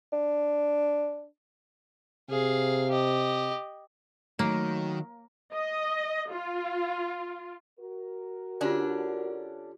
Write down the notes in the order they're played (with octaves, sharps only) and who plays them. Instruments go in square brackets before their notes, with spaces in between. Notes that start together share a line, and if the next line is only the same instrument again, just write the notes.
[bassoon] D4
[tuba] C3 [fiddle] G#4 F5
[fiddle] G4 D#5
[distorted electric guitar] D#3 [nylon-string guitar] F#3 [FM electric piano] A3 [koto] A#3
[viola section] D#5
F4
[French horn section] F#4 A#4
[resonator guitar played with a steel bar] D3 C#4 D4 [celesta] F4 G4 D5